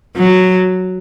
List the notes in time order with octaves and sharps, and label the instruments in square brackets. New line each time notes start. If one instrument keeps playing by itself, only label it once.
[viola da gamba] F#3